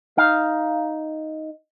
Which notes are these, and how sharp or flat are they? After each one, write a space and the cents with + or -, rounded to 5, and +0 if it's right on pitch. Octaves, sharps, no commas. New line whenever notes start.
D#4 +5 F5 +0